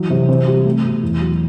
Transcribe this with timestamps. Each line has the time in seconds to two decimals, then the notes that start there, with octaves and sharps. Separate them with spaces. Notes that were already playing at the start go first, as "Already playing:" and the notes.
Already playing: E3 F#3
0.10 C3
0.29 C4
0.48 G3
0.66 A3
0.84 B2
1.03 E2
1.20 F#3